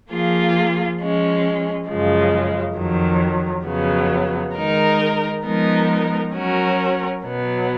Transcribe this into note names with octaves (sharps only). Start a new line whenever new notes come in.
F3 A#3 F4 G#4
F3 G#3 C#4
F#2 C#3 F3 G#3
F2 D#3 F#3
F2 C#3 F#3 B3
D#3 G#3 D#4 A#4
F3 G#3 B3 D#4 A#4
F#3 C#4 F#4 A#4
B2 F#3 B3